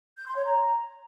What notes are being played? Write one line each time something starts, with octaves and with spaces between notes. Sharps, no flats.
G6
C6
C#5
A#5